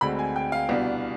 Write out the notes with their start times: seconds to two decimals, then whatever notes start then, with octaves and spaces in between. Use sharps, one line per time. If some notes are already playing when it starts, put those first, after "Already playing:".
0.01 D2 D3 G#3 C4 B5
0.19 G#5
0.36 G5
0.52 F5
0.69 C2 B2 B3 D4